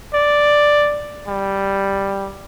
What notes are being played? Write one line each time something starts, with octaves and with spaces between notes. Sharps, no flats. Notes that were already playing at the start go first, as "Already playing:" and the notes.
D5
G3